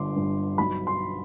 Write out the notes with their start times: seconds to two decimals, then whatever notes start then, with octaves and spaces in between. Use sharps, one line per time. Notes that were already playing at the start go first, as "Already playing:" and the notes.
Already playing: G1 G2 D3 C6 D6
0.16 G2
0.58 B1 B5
0.87 C6